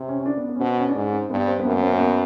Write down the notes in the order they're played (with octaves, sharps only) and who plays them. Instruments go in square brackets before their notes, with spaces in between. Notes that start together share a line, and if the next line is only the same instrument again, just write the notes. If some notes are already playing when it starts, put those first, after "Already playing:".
Already playing: [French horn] C3
[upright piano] C#4
C#4
D4
B3
B3
C#4
[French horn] B2 [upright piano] C4
[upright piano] C#4
D4
[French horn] G#2 [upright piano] C#4
[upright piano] C4
[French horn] G2 [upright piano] B3
[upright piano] C4
B3
[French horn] F#2 [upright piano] A#3
[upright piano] B3
C4
A#3
B3